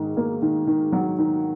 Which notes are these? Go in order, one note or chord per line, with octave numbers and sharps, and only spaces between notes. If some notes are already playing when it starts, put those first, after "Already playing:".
Already playing: G#2 D#3
A#3
D#3
D#3
F#3
D#3